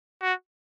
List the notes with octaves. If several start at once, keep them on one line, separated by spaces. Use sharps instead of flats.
F#4